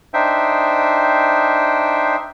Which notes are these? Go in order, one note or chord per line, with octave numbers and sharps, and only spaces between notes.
D4 D#4 C5 E5 G5